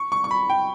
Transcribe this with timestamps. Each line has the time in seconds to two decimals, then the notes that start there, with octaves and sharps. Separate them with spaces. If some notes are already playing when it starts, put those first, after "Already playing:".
Already playing: C#6
0.12 C#6
0.24 C#6
0.31 B5
0.49 G5